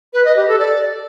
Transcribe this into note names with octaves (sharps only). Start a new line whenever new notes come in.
B4
D#5
G4
A4
D5